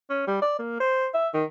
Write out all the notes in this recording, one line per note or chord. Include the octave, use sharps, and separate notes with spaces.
C#4
G3
D5
A#3
C5
E5
D#3